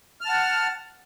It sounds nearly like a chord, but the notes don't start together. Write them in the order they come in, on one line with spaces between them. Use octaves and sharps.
F6 A5 F#5